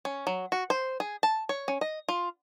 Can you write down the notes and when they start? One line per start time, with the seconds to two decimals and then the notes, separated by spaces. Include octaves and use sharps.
0.05 C#4
0.27 F#3
0.52 F#4
0.70 C5
1.00 G#4
1.23 A5
1.49 C#5
1.68 C#4
1.81 D#5
2.08 F4